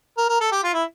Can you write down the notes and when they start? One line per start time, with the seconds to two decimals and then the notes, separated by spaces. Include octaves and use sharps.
0.17 A#4
0.29 A#4
0.41 A4
0.52 G4
0.63 F4
0.73 E4